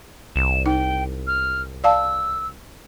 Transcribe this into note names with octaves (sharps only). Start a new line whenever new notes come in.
C2 E7
D#4 G5
F6
D5 F5 A5 E6